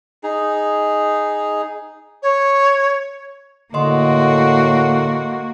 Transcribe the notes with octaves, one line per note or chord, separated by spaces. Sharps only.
D#4 G#4
C#5
A2 D3 A#3 F#4 D#5 C6